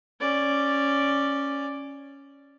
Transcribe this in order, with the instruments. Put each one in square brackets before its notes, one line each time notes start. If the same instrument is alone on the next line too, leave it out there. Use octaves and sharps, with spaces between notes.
[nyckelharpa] C#4 D5